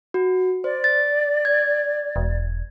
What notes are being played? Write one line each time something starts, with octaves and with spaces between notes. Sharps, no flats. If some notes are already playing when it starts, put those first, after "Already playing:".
F#4
C5 D5
A6
G#6
E1